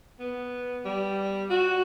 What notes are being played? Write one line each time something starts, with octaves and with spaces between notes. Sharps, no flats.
B3
G3
F#4